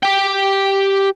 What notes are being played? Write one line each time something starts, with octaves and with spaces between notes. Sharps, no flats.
G4 G5